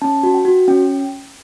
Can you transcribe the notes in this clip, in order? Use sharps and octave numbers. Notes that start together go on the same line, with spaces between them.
C#4 A5
F#4
G5
F#4
C#4 G5